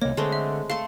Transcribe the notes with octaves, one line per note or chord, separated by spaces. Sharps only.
C2 A#3 C#5 D#5
D3 G#3 A3 C4
E5
A3 A4 F5 C6